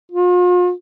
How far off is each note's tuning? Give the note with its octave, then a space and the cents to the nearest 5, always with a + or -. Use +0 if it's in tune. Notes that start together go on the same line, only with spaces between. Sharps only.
F4 +40